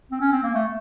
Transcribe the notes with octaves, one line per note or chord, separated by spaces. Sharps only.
C4
C#4
C4
A#3
A3